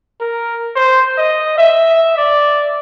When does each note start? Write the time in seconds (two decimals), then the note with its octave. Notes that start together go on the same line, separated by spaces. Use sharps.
0.20 A#4
0.76 C5
1.18 D#5
1.58 E5
2.17 D5